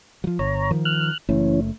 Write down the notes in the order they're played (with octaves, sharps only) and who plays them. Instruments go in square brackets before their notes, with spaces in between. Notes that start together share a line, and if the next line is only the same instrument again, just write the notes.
[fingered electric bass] F3 F#3
[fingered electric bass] G1 [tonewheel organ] C#5 A#5
[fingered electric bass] D#3 F3
[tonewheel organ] F6 F#6
[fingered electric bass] F#1 A3 [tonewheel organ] E3 C#4